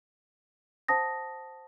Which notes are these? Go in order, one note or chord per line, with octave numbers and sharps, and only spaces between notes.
C5 F#5 A5 D#6 A#6